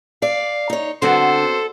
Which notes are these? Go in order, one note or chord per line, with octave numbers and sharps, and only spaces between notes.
D5 F5
D#4 C#5
D3 B3 C4 F#4 A4 C5